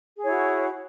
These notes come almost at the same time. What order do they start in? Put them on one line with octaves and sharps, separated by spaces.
G#4 C#5 E4 F#4